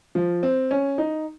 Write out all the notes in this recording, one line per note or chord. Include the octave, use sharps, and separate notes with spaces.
F3
C4
C#4
D#4